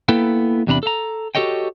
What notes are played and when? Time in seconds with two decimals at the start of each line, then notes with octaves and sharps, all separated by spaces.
0.08 A#3 B3 E4 A4 B4 G5
0.67 E2 C3 D4 A#5 B5
0.83 A4 A#5
1.35 F#4 G4 A4 C#5 D#5 G5